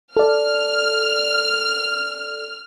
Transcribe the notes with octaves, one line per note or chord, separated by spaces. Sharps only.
A4 D5 F6